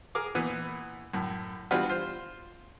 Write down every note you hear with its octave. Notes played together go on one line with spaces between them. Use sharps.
G#4 A#4 D6
A#2 E3 B3
F#2 A2
E3 G3 B3 D4 F4 F#4
F4 C5